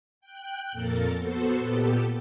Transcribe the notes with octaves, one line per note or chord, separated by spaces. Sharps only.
G5 F#6
F2 A#2 A4 A#4 A5
B3 F#4 A4 C5
A#2 B3 G4 A4